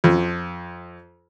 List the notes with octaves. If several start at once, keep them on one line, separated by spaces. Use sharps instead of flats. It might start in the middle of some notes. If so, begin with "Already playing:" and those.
F2